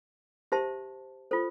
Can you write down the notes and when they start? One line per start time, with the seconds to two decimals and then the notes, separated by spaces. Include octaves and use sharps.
0.52 G4 C5 E5 A5 C6
1.31 F4 A4 C5